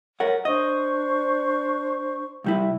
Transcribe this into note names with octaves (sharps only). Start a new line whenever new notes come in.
A#4 C#5 F#5
D4 C5 D#5 C#6
C2 G3 E4